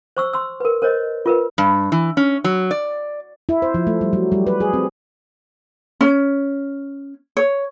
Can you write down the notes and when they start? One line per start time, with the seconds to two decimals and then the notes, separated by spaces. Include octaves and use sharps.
0.17 C5 C#6 E6
0.33 C6 E6
0.60 A#4 B4
0.82 A#4 C5 C#5 D#5
1.26 F4 A#4 B4
1.58 G2
1.92 E3
2.17 C#4
2.44 F#3
2.71 D5
3.49 E4
3.62 C5
3.74 F3
3.87 A3
4.01 G3
4.13 F#3
4.32 G3
4.47 B4
4.60 G#4
4.73 C4
6.01 C#4
7.37 C#5